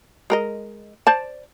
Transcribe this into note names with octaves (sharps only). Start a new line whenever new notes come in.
G#3 A#4 D#5
C5 D5 A5